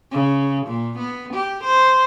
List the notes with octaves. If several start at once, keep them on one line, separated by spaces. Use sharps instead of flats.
C#3
A#2
B3
G4
C5